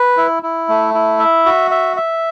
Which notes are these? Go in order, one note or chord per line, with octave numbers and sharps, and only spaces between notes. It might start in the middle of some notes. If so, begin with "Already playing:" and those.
Already playing: B4
E4
E4
A3
E4
E5
F#4
E5
E5